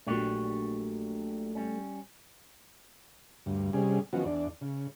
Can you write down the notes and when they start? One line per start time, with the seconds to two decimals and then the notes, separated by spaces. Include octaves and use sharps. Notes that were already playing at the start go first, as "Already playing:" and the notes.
0.07 A#1 A#2 F#3 A3 D4 G4 C#5
1.55 G3 C#4
3.46 D2 G2
3.73 C3 G3 C#4 G#4
4.13 D#3 F3 F#3 B3 C#4 F#4
4.25 E2 D4
4.61 C#3